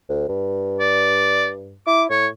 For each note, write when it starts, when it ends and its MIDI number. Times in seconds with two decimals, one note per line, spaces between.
0.09 0.27 38
0.29 1.80 43
0.80 1.50 74
1.87 2.07 64
1.87 2.03 86
2.10 2.30 45
2.10 2.27 73